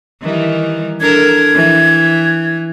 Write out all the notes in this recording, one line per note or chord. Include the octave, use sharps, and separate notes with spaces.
D#3 E3 G3
D4 A4 A#4 G#6
E3